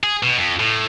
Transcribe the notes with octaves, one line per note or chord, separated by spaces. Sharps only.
G#4
B2
F2
A2